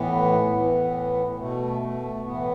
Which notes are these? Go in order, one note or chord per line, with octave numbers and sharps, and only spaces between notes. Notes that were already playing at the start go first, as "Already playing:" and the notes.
Already playing: A2 E3 B3
A2 E3
B2 A3
A3
A2 E3 B3